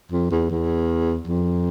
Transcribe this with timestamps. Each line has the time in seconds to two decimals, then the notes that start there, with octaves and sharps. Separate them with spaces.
0.12 F2
0.31 E2
0.50 E2
1.27 F2